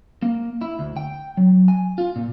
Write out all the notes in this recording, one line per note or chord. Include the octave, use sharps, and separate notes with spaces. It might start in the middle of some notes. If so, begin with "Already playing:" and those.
A#3
E4
D2
G5
F#3
G#5
F4
A#2